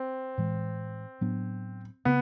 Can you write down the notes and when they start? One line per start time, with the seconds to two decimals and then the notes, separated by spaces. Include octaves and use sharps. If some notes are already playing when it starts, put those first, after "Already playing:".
Already playing: C4
0.38 A2 E3 G#3
1.21 A2 F#3 B3 D4
2.05 C#3 B3